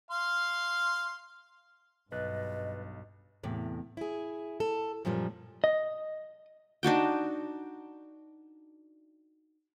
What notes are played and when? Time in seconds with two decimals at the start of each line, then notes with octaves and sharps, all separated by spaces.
0.11 F5 C6
2.12 B1 G2 B4 D#5 F#6 A6
3.43 E2 A2 C3
3.97 E4 G#4
4.60 A4
5.05 F#2 A#2 F3 G3
5.64 D#5
6.83 D4 D#4 F#4 G5